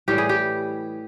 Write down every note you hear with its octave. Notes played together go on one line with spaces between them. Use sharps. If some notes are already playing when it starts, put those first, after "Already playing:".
A2 E3 G3 G4
G#4
G4